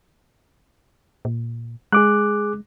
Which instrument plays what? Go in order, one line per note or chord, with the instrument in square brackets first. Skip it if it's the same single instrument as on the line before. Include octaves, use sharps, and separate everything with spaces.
[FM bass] A#2
[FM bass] G#3 [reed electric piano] G#4 D6 F#6